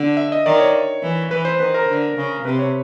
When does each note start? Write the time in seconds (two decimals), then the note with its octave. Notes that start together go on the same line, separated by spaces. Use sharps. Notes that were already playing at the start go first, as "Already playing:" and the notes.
Already playing: D3
0.17 E5
0.32 D#5
0.45 D#3 D5
0.60 C#5
1.03 E3
1.31 E3 B4
1.45 C5
1.60 D#3 B4
1.74 A#4
1.88 D3
2.17 C#3
2.45 C3 B4
2.59 C#5